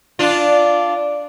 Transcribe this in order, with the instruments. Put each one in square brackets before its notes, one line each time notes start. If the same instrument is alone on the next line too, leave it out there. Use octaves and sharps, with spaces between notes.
[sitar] D4 F4